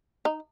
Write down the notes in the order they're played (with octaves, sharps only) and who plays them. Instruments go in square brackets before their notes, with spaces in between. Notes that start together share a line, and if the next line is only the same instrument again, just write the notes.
[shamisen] D#4